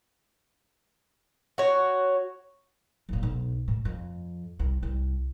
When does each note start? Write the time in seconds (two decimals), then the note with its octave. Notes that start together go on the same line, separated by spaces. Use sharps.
1.58 F#4 C#5
3.09 F#1 A#2
3.23 B1
3.68 D2 A2
3.85 F2
4.59 C2
4.83 C2